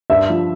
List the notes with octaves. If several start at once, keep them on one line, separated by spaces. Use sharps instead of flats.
G2 E5
F3